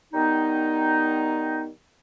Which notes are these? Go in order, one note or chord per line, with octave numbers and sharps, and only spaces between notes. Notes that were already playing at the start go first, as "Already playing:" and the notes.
D#3 G3 B3 D#4